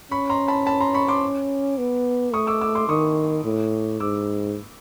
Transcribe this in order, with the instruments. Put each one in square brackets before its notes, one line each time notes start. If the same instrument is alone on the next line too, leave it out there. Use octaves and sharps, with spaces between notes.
[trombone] C#4 [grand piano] B5 C#6
[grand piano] A#5 C6
A5 B5
A5 B5
A#5 C6
B5 C#6
C6 D6
[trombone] B3
[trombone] A3 [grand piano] C#6 D#6
[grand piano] D6 E6
D6 E6
C6 D6
[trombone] D#3 [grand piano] C#6 D#6
[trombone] A2
[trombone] G#2 [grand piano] D6 E6